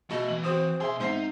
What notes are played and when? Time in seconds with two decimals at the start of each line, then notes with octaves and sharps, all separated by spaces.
0.11 B2 A3 D#5
0.28 E3 F#7
0.44 C4 F#4 C5 D#6
0.80 B2 G#4 E5 C6
1.00 G#2 C4 D#4 C5 E5 C7